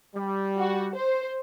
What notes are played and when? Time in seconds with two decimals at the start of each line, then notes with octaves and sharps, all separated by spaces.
0.14 G3
0.57 F#4
0.95 C5